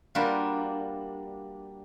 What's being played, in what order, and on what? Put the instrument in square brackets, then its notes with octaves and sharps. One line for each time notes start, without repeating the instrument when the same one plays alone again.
[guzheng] G3 A#3 D4 F4 F#4 B4